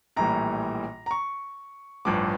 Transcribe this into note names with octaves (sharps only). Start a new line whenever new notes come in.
A#1 A2 E3 G3 A#5
A#5
C#6
A1 G2 F3 D6